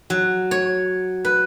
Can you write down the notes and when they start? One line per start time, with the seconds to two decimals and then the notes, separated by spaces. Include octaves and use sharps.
0.10 F#3
0.51 C#5
1.25 B4